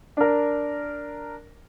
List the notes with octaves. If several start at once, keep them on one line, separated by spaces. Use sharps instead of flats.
D4 A#4